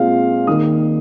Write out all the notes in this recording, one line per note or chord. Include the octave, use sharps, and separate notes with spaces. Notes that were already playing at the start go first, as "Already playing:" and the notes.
Already playing: A#2 G#3 C4 F5
D#2 D#3 A#3 D#6